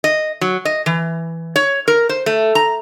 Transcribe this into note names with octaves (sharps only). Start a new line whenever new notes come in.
D#5
F#3
D#5
E3
C#5
A#4
C5
A3
A#5